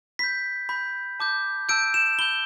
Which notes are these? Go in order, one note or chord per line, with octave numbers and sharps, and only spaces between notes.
B5 G6 B6
B5 G6
A5 D6 G6
A5 E6 G6 D7
E7
B5 G6 G7